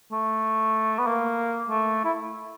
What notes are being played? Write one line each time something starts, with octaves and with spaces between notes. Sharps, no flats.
A3
B3
A#3
A3
E4